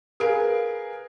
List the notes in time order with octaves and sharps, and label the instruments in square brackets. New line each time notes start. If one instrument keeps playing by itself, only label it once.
[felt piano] G#4 A#4 B4 F5 D7